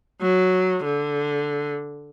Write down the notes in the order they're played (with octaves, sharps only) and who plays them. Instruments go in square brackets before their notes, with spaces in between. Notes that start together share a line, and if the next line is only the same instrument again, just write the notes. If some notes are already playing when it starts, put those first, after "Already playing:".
[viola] F#3
D3